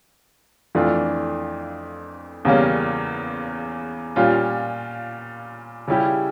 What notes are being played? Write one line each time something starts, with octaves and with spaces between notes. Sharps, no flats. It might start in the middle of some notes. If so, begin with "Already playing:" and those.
F2 E3 A3 D4 F4
E2 C#3 G3 A#3 C#4
A#2 G3 C#4 F4
C#3 G3 C#4 E4 G4